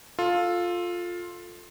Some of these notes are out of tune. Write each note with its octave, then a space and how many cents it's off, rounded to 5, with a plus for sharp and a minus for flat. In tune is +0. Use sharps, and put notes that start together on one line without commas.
F4 +10 A4 +0